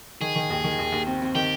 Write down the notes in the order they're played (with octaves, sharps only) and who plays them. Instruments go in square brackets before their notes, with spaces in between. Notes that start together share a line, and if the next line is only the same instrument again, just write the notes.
[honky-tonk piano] D#3 [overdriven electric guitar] G#4
[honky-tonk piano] D#3
D#2
D#3
D#2
D#2
C4
C4
[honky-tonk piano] D#3 [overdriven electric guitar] G4